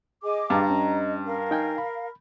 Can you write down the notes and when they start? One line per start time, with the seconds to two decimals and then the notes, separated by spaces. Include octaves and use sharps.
0.24 G#4 D#5 G#5 D6
0.50 G2 F5 A5 A#5
0.70 C#4 D#5
1.26 A#4 F5
1.51 D#4 G5 G#5
1.78 B5